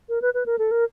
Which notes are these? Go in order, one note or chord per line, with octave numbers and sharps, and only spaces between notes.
A#4
B4
B4
A#4
A4
A#4